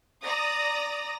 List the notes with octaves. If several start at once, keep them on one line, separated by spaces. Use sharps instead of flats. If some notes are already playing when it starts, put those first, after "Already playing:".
D5 A#5 D#6 A#6